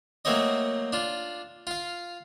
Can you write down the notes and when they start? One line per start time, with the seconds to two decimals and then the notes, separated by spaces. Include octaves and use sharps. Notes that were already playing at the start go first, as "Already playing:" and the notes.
0.25 F#3 A3 A#3 C4 C#5 D#5
0.93 D4 F4
1.67 F4 F5